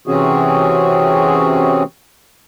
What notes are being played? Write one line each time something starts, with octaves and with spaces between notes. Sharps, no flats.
C3 E3 C4 C#4 F#4 G#4